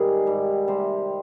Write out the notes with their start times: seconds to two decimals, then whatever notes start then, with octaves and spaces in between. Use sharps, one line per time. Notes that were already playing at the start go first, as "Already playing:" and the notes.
Already playing: G#2 C3 D#3 G3 G#4 A#4
0.27 G#2 G3
0.68 C3 G3 C5